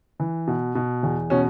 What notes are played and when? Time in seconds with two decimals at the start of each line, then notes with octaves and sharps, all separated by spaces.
0.20 E3
0.47 B2
0.75 B2
1.03 E2
1.30 B2 C#4